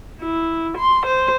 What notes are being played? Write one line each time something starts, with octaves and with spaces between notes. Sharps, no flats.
E4
C6
C5